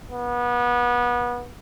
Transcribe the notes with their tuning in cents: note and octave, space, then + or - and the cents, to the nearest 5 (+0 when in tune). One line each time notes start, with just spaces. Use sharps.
B3 -25